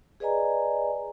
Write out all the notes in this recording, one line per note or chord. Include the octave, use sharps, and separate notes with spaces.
G#4 B4 D5 D#5 G#5 A#5